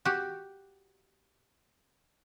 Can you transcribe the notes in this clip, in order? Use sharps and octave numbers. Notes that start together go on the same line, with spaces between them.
F#4 G4